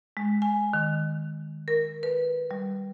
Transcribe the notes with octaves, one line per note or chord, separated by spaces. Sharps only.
G#3
G#5
D#3
A#4
B4
G3